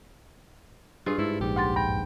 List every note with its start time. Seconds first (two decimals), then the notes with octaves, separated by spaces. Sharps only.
1.06 G2 F4 G#4
1.18 G#2 E4 A4
1.41 A#1 G#2 G4
1.56 D2 C6 A6
1.76 G2 G5